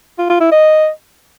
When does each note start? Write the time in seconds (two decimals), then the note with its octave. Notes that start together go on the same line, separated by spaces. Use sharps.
0.19 F4
0.30 F4
0.41 E4
0.52 D#5